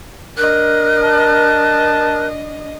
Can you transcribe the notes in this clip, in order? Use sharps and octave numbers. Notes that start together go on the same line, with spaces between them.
D4 A#4 D#5 F#6
A5